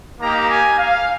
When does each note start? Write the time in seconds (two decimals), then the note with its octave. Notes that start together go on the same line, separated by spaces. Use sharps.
0.20 A#3 D#4 G4 A#5
0.49 G#5
0.78 F5